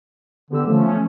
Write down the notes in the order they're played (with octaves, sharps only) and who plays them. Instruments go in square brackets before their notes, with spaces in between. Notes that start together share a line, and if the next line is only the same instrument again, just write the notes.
[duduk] D3 [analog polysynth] B3 G4 E6
[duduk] F3 [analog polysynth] A3 C#4